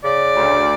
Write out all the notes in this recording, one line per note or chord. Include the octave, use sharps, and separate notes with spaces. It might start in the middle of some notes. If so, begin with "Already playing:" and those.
C#3 D5
D2